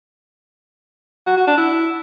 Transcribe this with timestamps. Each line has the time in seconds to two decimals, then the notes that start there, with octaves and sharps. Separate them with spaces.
1.27 F#4
1.37 F#4
1.47 D4
1.58 E4